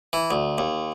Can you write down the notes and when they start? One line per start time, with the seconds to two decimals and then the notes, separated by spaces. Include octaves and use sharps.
0.13 E3
0.31 D2
0.58 D#2